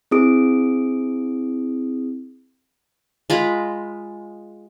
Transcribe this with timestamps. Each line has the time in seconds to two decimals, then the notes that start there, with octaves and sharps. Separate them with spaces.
0.11 C4 E4 G#4 D#6 D7
3.30 G#3 F4 A#5 B5